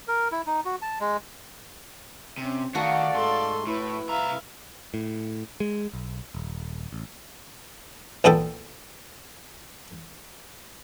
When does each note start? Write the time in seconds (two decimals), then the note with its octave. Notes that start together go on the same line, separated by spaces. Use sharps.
0.08 A#4
0.32 E4
0.47 D#4
0.65 F#4
0.82 A5
1.00 G#3
2.38 C3 C4 C#4
2.75 D#3 A3 F#4 D5 F5 F#5
3.15 G#2 A4 C6
3.67 A2 E4 B4
4.09 C2 E5 F5 A#5
4.94 A2
5.60 G#3
5.93 B1
6.35 D#1
6.92 A1
8.24 B1 A#2 B3 A4 G5